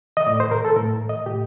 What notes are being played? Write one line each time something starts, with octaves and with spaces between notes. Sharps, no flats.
D#5
A2 D5
C5
A#4
A4
A2 A#4
D#5
A2 G4